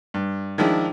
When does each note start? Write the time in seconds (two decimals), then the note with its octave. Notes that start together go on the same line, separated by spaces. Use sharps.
0.14 G2
0.58 D#3 F3 G#3 D4 E4